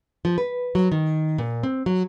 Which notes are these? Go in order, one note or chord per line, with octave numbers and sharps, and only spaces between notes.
F3
B4
F#3
D#3
A#2
C4
F#3